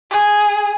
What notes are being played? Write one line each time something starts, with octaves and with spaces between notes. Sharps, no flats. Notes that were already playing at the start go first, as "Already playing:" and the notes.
G#4